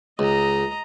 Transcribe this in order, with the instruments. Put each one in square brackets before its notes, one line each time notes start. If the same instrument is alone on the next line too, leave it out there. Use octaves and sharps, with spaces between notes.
[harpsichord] C#2 [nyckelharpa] D#5 A#5